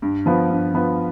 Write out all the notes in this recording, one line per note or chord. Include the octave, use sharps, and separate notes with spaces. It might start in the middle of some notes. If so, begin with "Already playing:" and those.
G2
F3 B3 F4 B4
G2
F3 B3 F4 B4